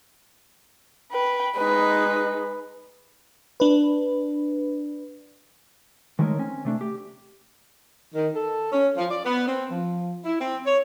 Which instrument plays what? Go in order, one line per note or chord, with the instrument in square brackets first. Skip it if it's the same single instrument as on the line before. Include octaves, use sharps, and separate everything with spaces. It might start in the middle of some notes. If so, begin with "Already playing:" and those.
[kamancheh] B4 G5
[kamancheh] G#3 D#4 [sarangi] B4
[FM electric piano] D4 B4
[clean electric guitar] D#3 G#3 A3 D#4 A#4 C#5
C4 C#4 G#5
C3 A3 D4
G4
[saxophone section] D#3
A4
C#4
F3
D5
B3
C4
F3
E4
C4
C#5